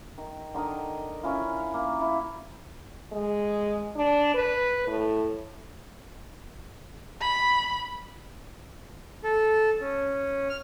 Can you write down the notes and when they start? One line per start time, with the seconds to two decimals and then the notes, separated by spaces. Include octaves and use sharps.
0.18 D#3
0.54 D3 D#3 A#4 D#5
1.23 C#4 E4 F4
1.74 A#3
2.01 E4
3.12 G#3
3.96 D4
4.34 B4
4.87 A2
7.21 B5
9.24 A4
9.81 C#4
10.49 F6